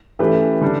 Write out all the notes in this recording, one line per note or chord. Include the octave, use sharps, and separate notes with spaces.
E3 A3 C#4 G4 B4
D3 G3 D4